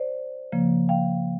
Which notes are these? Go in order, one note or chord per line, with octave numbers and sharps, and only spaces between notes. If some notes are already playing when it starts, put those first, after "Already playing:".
Already playing: C5 D5
C#3 F3 A#3
F5 G5